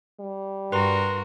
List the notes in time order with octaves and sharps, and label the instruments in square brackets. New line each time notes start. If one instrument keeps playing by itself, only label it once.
[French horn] G3
[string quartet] G2 F#4 A#4 [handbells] B4 C6